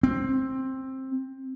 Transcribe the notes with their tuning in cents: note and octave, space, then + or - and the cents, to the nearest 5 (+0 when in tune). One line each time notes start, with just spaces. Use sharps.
C4 +10